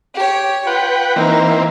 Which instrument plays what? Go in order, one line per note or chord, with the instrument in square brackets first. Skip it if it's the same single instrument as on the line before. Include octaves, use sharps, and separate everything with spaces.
[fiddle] G4 C#5
[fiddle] F4 [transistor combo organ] B4 F#5 G5
[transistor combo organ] E3 A#3 C4 [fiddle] D#4